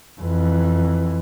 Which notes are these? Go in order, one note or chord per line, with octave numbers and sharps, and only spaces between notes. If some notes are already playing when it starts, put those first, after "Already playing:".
F2 E3